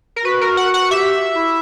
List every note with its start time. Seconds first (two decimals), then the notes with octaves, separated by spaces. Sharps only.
0.16 A#4
0.25 F#4 B4
0.41 A#4
0.57 F#5
0.74 F#5
0.91 G4 E5
1.35 E4